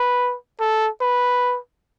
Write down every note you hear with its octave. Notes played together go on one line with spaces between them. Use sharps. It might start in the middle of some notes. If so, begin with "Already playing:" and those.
Already playing: B4
A4
B4